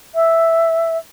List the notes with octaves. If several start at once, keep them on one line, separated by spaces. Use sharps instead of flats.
E5